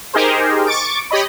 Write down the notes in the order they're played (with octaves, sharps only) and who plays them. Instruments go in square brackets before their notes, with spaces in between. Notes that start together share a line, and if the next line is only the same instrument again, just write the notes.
[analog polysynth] D#4 G4 G#4 A#4 C5
C#6 D6 A6 D7
G4 C#5 D#5 B5